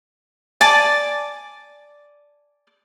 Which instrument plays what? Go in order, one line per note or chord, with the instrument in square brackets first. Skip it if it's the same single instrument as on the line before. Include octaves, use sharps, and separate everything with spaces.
[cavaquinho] D5 G#5 A5 D6